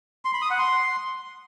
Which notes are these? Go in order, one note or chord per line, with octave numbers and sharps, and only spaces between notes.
C6
B5
D#6
F#5
C6